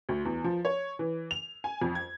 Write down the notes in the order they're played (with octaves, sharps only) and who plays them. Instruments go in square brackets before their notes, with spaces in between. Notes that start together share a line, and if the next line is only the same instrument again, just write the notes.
[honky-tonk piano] D2
E2
F3
C#5
E3
F7
G#5
F2
G#6